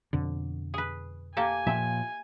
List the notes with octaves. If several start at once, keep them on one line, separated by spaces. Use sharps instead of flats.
F2 B2 D3
G#4 B4
A#3 G4 A4 G#5
A#2 F3 E5 G5